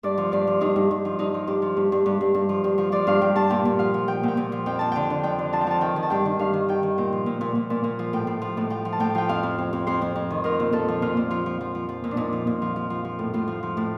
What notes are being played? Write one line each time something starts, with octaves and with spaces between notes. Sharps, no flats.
G2 D5
F3
G2 D5
F3
G2 D#4
G2
G2
F3
G2 D#4
F3
G2 G4
F3
G2
G2
G2
G2
G2
F3
G2
F3
F3 D5
G2 F5
G2 G5
G2 A5
A#2 G5
A#2
F3 F5
F3
F3 G5
A#2 G5
A#2
F3
F2 G5
F2 A5
D3 G5
D3
F2 G5
D3
F3 A5
G5
F3 A5
D#3 G5
D#3
A5
G2 G5
D#3
G2 F5
D#3
D#3 G5
D#3
A#2 G5
F3
A#2
A#2
A#2
A#2
A#2
F3
A2 G5
A2
F3
A2
F3 G5
F3
A5
A2 G5
F3 G5
F2 F5
F2
F2
F2
F2 C5
F2
F2
D#3
F3 A#4
A#2
A#2 A4
F3
A#2 F4
A#2
F3 F4
F3
F3
F3
F3
A#2
D4
A#2 D#4
F3
A#2
F3
F3
F3
F3
A2
A2 F4
F3
F3
A2